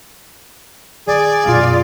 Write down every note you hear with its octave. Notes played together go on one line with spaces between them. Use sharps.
D#3 G#4 D5
F#2 B2 F4